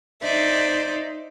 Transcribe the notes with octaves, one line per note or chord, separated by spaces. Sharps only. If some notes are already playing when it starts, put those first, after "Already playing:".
D#4 C5 D5 E5